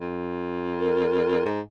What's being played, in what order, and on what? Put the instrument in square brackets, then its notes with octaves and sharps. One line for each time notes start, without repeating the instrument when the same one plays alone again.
[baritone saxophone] F2
[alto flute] A#4
[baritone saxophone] G#2